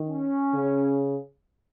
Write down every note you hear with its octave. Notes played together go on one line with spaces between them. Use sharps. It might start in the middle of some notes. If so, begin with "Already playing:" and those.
Already playing: D#3
C#4
C#3